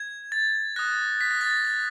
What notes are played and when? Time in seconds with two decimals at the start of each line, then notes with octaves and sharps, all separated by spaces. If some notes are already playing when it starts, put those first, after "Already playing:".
Already playing: G#6
0.32 A6
0.76 D#6 F#6 A#6
1.21 B6
1.31 A#6
1.41 A6
1.51 A#6
1.65 A6